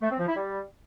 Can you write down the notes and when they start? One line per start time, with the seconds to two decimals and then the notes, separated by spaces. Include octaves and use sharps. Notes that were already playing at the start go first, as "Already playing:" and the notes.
0.02 A3
0.10 C4
0.19 F3
0.27 E4
0.36 G3